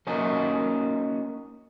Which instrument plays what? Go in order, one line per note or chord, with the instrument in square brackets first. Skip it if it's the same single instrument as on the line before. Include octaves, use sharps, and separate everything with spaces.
[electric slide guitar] A#3 C#4 D#4 F#4